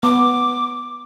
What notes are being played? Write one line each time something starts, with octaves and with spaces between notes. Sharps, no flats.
B3 D6